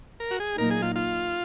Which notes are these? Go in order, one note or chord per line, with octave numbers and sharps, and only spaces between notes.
A#4
F#4
G#4
A#2 F#3 A#3 D#4 A#4
G#4
F4
F4